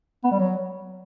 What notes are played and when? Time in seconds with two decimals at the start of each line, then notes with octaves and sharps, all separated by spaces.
0.24 B3
0.31 G3
0.39 F#3